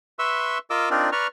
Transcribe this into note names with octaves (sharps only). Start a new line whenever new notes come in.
B4 E5 C6 C#6 E6
F4 A#4 D#5 D6 E6
C4 D4 D#4 F4 A#4 D5
B4 D5 A#5 C#6 F6